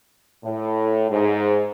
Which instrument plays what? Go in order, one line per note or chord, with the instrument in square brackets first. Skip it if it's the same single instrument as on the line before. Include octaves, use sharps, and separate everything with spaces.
[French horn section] A2
G#2